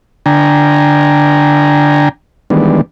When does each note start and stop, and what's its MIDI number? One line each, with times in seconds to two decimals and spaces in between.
0.26 2.09 50
0.26 2.09 62
0.26 2.09 79
0.26 2.09 80
0.26 2.09 82
2.50 2.81 51
2.50 2.81 52
2.50 2.81 55
2.50 2.81 56
2.50 2.81 59
2.50 2.81 62